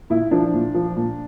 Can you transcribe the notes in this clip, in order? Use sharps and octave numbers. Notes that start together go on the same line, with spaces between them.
A#2 E4
F3 D4
A#2
F3
A#2